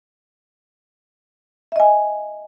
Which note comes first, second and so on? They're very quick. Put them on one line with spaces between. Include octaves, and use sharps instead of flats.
E5 D#5 G#5